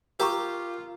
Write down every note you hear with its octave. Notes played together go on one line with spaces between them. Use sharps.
F4 G4 A#4 A#5 C#6